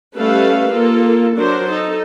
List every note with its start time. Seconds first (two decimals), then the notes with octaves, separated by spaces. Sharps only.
0.17 G3 A3 C#4 A4 B4 F5
0.71 A#3 F4 A4
1.37 F#3 D4 A#4 C5
1.71 D#4 A4